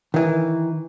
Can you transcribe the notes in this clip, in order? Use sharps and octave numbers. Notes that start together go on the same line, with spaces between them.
D#3 E3